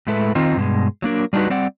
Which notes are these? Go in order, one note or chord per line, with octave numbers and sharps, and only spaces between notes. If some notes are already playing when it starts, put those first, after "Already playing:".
A2 G#3 E4 A4 B4
D#3 C4 D#4 F4
G2 B2 G#3
F#3 A#3 D4 A#4
G3 D4 D#4 F4 F#4 B4
G3 C4 D5 F#5